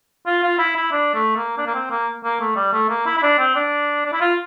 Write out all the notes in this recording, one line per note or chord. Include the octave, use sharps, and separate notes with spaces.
F4
F4
E4
E4
D4
A3
A#3
D4
A#3
C4
A#3
A#3
A3
G3
A3
A#3
E4
E4
D4
C4
D4
D4
E4
F4